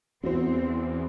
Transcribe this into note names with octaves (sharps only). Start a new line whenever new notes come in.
E2 B3 C4 E4 F#4 C5